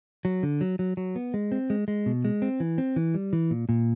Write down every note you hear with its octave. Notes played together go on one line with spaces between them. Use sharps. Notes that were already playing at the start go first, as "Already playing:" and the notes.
F#3
D3
F#3
F#3
F#3
B3
G#3
C4
G#3
G#3
B2
G#3
C4
E3
C4
E3
G3
E3
A#2
A#2